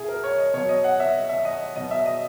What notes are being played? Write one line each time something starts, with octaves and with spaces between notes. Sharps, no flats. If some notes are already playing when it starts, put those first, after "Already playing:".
Already playing: B2 E4 G#4
A#4
C#5
D#5
B2 F#3 C#5
D#5
F#5
E5
E5
D#5
B2 F#3 D#5
E5
D#5